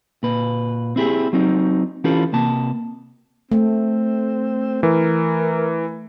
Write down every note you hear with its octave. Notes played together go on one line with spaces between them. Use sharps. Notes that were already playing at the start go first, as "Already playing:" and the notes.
A#2 B4
C4 E4 G4 G#4
F#3 C4 D#4
E3 C#4 F4 G4 A4 B4
C3 A#3 A5
A3 C4
E3 A#4